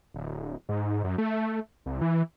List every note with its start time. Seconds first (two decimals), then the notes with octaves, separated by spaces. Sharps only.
0.14 D1
0.69 G#2
1.04 F#2
1.18 A3
1.86 C2
2.01 E3